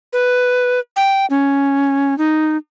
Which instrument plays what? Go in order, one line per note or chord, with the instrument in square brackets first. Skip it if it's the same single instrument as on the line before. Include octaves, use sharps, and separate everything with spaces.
[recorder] B4
G5
C#4
D#4